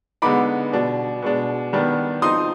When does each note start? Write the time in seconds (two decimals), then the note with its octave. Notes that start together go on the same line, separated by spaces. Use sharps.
0.22 D3 G#3 B3 D#4 B5 D6
0.72 B2 G3 D4
1.22 B2 G#3 D4
1.73 D#3 G3 B3 D4
2.22 F3 C4 D#4 C6 D#6